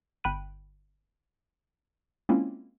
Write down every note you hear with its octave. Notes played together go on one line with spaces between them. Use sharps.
G1 G5 B5 F#6 D#7
G#3 A#3 C4 C#4 E4 F4